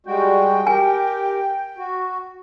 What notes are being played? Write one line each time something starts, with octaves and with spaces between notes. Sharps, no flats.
G3 G#3 F#4 G5
G4 A#4 G#5
F#4